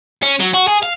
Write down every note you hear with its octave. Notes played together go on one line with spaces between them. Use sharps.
C#4
F#3
F#4
G#4
F5